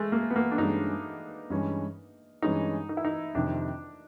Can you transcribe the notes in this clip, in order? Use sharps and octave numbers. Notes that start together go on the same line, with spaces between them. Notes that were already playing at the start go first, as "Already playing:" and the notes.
Already playing: G#3 A3
A#3
B3
A#3
D4
G2 E3 G#3 C#4 D#4
G2 E3 G#3 C#4
G2 E3 G#3 C#4 D#4
D#4
E4
D#4
F2 C3 D#3 D4